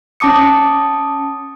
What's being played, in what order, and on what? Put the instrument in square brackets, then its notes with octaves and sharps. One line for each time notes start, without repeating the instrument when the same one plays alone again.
[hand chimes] C#4 A5 D6 D#6 C#7